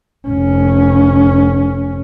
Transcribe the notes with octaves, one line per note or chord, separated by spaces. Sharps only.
F1 C#4